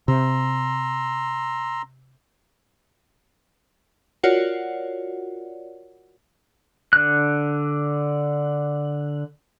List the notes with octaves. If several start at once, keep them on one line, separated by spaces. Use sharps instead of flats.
C3 A#5 C6 E6
F4 F#4 A#4 C#5 D5 F#5
D3 F#6